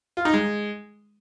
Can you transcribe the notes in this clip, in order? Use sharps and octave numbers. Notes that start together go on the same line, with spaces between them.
F4
D#4
G#3